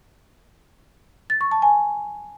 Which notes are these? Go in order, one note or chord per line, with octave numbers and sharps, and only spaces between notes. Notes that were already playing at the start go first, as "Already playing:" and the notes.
A6
C#6
A5
G#5